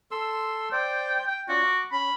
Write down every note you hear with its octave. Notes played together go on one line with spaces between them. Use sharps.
A4 C6 E6
C5 D5 G5
G5
C#4 F4 F#4 D5
D6
C#4 B5